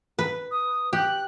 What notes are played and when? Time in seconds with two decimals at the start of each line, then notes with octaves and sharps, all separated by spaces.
0.19 B4
0.51 D#6
0.93 G4 F#6